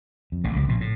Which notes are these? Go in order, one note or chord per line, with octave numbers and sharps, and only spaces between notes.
F2
A1 A2
C#2 C#3
A#1 A#2
A2